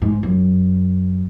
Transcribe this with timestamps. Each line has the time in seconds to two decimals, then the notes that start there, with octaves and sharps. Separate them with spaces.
0.02 G#2
0.23 F#2